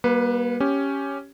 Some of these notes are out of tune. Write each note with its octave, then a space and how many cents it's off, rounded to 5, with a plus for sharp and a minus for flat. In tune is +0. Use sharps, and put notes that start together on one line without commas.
G3 +0 A#3 +40 B4 +0
C#4 +0 G4 +0